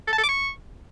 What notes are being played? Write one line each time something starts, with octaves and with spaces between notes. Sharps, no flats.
A4
A5
A4
D6
C#6